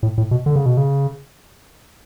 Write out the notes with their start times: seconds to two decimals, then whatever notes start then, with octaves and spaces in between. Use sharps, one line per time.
0.03 A2
0.18 A2
0.31 B2
0.46 D3
0.56 C#3
0.66 B2
0.77 C#3